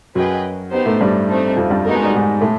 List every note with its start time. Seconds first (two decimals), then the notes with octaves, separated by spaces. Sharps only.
0.15 F#2 F#3 G#4 B4 D#5 G5
0.71 B3 D#4 G4 C5
0.86 A2 A3
1.01 G2 G3
1.29 A3 C4 D#4
1.57 F2 F3
1.70 G2 G3
1.85 A3 B3 D#4 F#4 A#4
1.95 G#3
2.05 G3
2.15 G#2 G#3
2.41 A2 A3